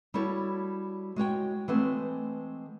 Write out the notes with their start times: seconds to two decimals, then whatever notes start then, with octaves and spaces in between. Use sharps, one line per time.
0.14 G3 E4 F#4 A4 C#5
1.16 G#3 F#4 C#5 G5
1.68 E3 G#3 A3 B3 C4